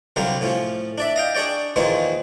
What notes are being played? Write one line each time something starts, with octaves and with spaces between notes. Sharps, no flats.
C2 D3 F#3 G3 G4 F5
A2 F3 C#4
D4 D5 E5
D#5 F5 G5
D4 G#4 C#5 D5 G5
E2 A#2 D#3 F3 G#3 C#5